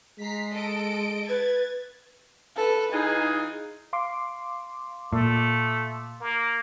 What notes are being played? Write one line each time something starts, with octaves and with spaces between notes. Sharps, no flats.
G#3 A#5 B6 C7
A4 D#5 D7
B4 G#6 A6
A4 B4
E3 D#4 F4 G#4
F5 C6 D6
A#2 A3
A#3